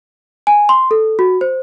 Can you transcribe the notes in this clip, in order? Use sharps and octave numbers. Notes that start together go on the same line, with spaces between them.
G#5
C6
A4
F#4
C5